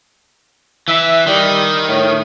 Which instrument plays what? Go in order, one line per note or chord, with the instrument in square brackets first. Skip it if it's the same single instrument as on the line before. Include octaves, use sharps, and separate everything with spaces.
[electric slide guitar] E3 [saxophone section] E5
[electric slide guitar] D#3 [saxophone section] G3
[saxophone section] A2